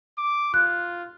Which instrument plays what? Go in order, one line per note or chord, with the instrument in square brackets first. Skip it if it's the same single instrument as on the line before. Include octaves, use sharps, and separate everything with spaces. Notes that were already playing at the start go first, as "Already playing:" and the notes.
[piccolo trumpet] D6
[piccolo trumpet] F4 [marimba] F#6